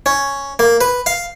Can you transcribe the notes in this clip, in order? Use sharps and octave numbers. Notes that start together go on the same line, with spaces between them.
C#4
A#3
B4
F5